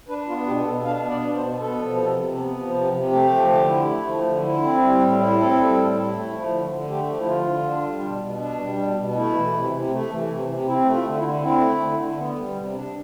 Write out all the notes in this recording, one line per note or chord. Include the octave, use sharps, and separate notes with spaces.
D4 B4
B3 F4
B2 G4
B2 A4
D4 F5
B3
D5
B2
C5
B2
B3 A4
F3
C3
C3
B3
F3
C3
C3
A3 G4
F3
D3
E4
A3
F3
D3
E4
C4
G3
A2
E4
C4 A4
G3
A2
E4
A3
F3
D3
D3
A3 G4
F3
E4
D3 F4
D3
D4
G3
B2
B2
D4
G3
B2
B2
A3 E4
E3
C3
C3
A3
E3
C3
C3
C4 E4
A3
F4
D3
E4
D3
C4 E4
A3
D3
D3
B3
G3
C3
D4